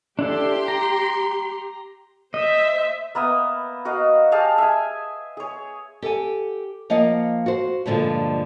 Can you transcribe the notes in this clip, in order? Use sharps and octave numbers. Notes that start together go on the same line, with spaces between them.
D4 E4 G4 A4 C6
A#5
C5 D#5 E5
A#3 B3 E5 D#6
F#4 A#4 D#5 F5
G4 G#4 F5 A5
E5 G#5
G#4 C#5
G4 A4 F#5 G#5
F3 A#3 D#5 F5 F#5
F#4 C5
G2 A#2 D3 F3 G#3